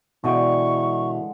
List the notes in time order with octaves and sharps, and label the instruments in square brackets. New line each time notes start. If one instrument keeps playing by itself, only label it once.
[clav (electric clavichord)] B2 D#5 G5 [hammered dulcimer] D3 G#3 C#5 [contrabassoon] E3 [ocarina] C#6